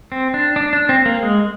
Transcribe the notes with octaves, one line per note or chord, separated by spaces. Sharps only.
C4
D4
D4
D4
C4
A#3
G#3